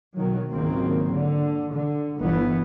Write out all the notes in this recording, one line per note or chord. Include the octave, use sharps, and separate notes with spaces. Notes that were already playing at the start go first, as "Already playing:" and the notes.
B2 D#3 F#3
G#1 C#2 D#3 F#3 A#3 C4
D3
D3
G1 E3 B3